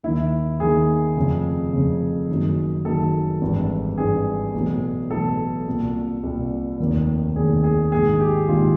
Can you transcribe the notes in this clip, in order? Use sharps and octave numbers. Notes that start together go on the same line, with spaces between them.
D#2 D#3 E4
D#2 D#3 G#4
F1 F2 C#3
F1 F2 C#3
F#1 F#2 D#3
F#1 F#2 D#3 A4
G#1 G2 E3
G#1 G2 E3 G#4
B1 A2 E3
B1 A2 E3 A4
C2 A#2
C2 A#2
F1 D#2 D#3
F1 D#2 D#3 G#4
G#4
A#1 G#2 D#3 G#4
G4
A#1 G#2 D#3 F4